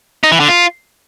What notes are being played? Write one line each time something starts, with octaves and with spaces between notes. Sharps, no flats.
D#4
E3
D3
F4